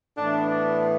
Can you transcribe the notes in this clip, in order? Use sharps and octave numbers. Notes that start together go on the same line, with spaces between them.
A2 E3 B3 D4
D4